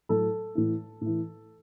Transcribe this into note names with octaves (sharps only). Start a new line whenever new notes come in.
A2 F#3 A4
A2 E3
A2 E3